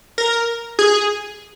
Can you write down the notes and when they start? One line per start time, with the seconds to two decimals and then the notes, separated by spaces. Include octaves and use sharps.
0.18 A#4
0.79 G#4